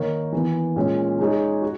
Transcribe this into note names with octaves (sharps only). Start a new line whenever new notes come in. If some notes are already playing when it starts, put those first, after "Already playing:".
Already playing: D#3 A#3 D#4 A#4 C#5
E3 B3 E4
A#2 G#3 C#4
G#3 D#4 G#4 C#5
F#4